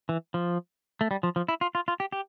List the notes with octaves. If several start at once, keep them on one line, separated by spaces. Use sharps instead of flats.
E3
F3
A3
G3
F3
F3
E4
F4
F4
F4
G4
G4